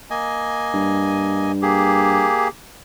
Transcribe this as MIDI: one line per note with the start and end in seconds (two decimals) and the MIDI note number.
0.10 1.52 58
0.10 1.52 75
0.10 1.52 80
0.74 2.29 43
1.62 2.48 58
1.62 2.48 67
1.62 2.48 68